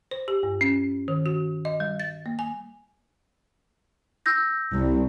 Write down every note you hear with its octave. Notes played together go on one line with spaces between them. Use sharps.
C5
G4
G2
C#4
D#3
F#4
D#5
G3
A6
A#3
G#5
E6 G6 A#6
C2